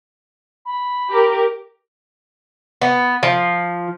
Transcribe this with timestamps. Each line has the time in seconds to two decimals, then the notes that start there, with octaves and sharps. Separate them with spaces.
0.65 B5
1.10 G4 A#4
2.82 B3
3.23 F3